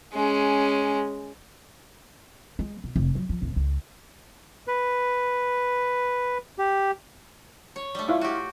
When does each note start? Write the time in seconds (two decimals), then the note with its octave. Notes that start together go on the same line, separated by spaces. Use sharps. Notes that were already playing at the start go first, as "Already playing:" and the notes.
0.13 G#3 C#4
2.59 G#3
2.84 B2
2.96 F1
3.15 F#3
3.29 F3
3.42 D1
3.56 C#2
4.68 B4
6.58 G4
7.76 C#5
7.95 G3 A3
8.08 E4 F4
8.21 F#4 G4